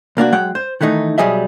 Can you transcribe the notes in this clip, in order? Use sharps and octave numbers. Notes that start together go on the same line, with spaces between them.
C2 A#3 D4 F#4
F#3 G#3 F#5 G5
C5
D#3 E3 A3 D#4
B1 F#3 G3 G#4 D#5 E5